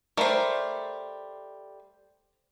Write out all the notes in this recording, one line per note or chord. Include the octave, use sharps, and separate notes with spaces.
G3 A3 A#4 C5